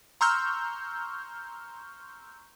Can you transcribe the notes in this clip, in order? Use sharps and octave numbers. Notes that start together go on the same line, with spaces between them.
A#5 C6 C#6 E6 F6 G6